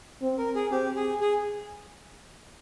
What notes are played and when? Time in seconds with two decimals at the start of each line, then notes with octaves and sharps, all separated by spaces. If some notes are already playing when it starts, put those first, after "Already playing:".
0.22 C4
0.38 A#4
0.55 G#4
0.71 C4 G4
0.96 G#4
1.21 G#4